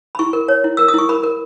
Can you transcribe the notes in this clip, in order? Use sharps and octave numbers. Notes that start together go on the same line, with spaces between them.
B5
E4 C#6
A#4
C#5
E4
A#4 E6
D#6
E4 C#6
A#4 B5
A#4